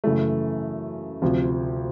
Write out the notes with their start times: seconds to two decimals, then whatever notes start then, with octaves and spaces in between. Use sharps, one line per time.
0.04 F#2 C#3 E3 A3
1.22 D2 C3 F3